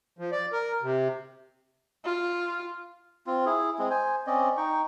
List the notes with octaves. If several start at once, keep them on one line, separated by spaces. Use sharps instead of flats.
F3
D5
A#4
C3
F4
C4 F4
E4 G#4
G#3 C4 G#4
C5 G#5
C4 C#4 D5 D#5
D#4 G5 C#6